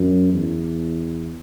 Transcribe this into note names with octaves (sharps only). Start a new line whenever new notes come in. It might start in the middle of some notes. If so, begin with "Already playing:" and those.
Already playing: F#2
E2